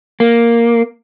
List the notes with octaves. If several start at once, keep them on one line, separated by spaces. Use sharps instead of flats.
A#3